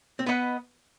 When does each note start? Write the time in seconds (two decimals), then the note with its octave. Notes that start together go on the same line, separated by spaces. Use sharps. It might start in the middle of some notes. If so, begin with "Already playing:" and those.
0.19 C4
0.26 B3 B4 D#5 F#5 B5